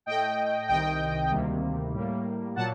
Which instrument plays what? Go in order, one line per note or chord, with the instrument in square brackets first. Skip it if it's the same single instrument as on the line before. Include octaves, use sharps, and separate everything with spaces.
[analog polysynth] A2 A3 D#5 G5
C2 C3 D#3 D#5 G5
D2 C3 D#3 G3 A#3
A2 G3 A#3
A#2 F#3 A#3 F#5 A5